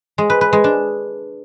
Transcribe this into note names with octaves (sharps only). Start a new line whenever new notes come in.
G#3
B4
B4
G#3
D4